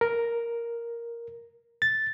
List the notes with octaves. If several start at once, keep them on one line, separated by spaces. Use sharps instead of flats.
A#4
A6